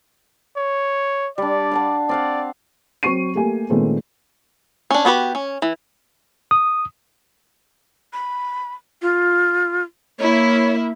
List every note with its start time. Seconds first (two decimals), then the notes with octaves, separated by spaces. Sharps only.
0.57 C#5
1.38 G3 D4 D5
1.71 F5 F#5 A5
2.09 C4 D5 F5 F#5
3.03 F#3 C4 C#6 C7 D#7
3.35 A3 A#3 G4 G#5
3.70 A#2 D#3 G#3 A3 B3 C4
4.90 C#4 D4
5.05 B3 F#4 G4 B4
5.35 C#4
5.62 E3
6.51 D#6
8.13 B5
9.02 F4
10.19 A#3 E4 C#5